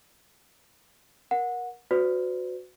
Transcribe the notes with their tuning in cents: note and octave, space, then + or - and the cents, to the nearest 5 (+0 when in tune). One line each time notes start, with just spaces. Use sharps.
A#4 +25 F#5 -20
F#4 -15 B4 +40 D5 -25